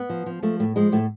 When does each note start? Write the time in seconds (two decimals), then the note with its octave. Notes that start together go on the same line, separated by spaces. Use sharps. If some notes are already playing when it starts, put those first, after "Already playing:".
Already playing: B3
0.10 F3
0.26 F3
0.42 F3 A3
0.59 A2 A3
0.76 F3 G#3
0.92 A2 A3